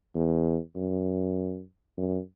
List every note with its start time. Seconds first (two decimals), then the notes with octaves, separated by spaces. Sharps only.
0.15 E2
0.76 F#2
1.97 F#2